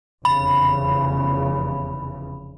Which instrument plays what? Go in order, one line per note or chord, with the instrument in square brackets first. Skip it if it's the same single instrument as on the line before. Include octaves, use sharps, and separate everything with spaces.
[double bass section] F1 E2 C#3 [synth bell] B5